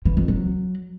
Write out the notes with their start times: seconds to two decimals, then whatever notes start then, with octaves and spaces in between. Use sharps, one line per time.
0.05 E3
0.17 F2
0.28 F#3